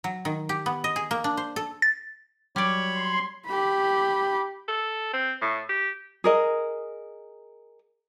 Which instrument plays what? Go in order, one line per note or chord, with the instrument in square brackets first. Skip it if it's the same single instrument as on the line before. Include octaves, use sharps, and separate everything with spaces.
[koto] F#3
D#3
G4
B3
D#5
G#4
A#3
D4
C5
A4
[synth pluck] A6
[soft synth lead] F#3 [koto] G3 D5 [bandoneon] C#5 B5 C#6
[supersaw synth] C6
[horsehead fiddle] G4 B5
[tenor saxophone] A4
C4
A2
G4
[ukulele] G#4 A#4 D#5